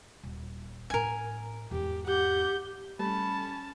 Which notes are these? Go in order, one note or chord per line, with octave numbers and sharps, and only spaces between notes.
D#1
A2 C4 A#4 G#5
E2 G#2 G4
G4 F#5 G6
G3 A3 C#4 A4 A5 B5